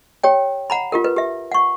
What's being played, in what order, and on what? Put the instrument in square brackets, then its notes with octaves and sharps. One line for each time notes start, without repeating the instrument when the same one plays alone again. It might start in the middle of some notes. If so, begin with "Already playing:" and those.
[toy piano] G4 C#5 G5
F#5 A#5 B5
F4 G4 A#4
B4
G4 E5
F#5 C#6